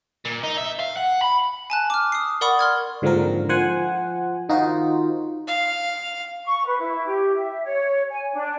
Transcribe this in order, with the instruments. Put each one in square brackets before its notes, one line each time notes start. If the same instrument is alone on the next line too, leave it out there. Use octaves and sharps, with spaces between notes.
[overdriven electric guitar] A#2
D#4
E5
F5
F#5
B5
[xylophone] G#5 A5 F#6
D6 F6
D#6 C7
A#4 D5 F#5 B5 C#6 D#6
C6 F6 G#6
[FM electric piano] G#2 D3 F3 A#3 C4 A#4
F3 C5 F#5 G#5
D#3 D#4 F4 F#4 C5
[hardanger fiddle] F5
[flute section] C#6
B4
E4
G4
E5
C#5
G#5
D4